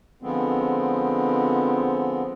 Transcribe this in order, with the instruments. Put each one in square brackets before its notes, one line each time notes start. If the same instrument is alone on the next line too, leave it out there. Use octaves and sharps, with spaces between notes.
[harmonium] D3 F3 G#3 B3 C4